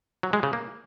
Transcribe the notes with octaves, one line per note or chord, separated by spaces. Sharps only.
F#3
G#3
C#3
A#3